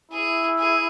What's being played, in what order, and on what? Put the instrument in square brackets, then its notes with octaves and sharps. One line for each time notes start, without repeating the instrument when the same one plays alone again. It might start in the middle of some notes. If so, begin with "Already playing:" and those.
[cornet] E4 [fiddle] G#4
[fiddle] G#4